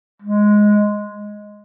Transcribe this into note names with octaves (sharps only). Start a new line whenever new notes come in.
G#3